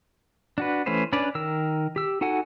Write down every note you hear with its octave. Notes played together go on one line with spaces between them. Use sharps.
D4 F#4 B4
E3 A3 C#4 B4 C5
C#4 D4 B4 D5
D#3 A#4 E6
G4 E6
D#4 F#4 A4 F#5 G#5